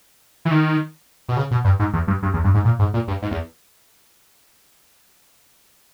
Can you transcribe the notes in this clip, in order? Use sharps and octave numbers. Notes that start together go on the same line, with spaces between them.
E3
D#3
B2
C#3
B2
G2
G#2
E2
G2
G2
E2
G2
G#2
A#2
G#2
A#2
G2
G#2
E2